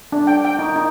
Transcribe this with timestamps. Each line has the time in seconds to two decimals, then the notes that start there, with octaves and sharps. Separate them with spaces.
0.12 D4
0.27 G5
0.45 G5
0.59 D#4
0.76 D#4